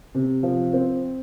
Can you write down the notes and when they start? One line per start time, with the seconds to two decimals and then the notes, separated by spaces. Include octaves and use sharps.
0.15 C3
0.43 F3
0.73 C4